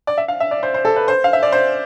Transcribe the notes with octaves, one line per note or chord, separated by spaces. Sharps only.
D5
E5
F5
E5
D5
C5
C5
A4
B4
C5
F5
E5
D5
C5